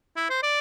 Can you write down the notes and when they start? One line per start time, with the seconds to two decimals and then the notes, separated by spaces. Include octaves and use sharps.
0.16 E4
0.30 C5
0.43 D5